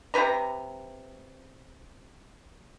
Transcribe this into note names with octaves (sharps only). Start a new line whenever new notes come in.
C3 E4 B4 A#5